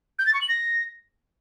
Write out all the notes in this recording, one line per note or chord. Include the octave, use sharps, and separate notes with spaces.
G6
A6
C#6
F#7
A#6